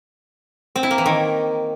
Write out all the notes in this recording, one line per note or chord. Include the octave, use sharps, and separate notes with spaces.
C4
E4
A#3
E3
D#3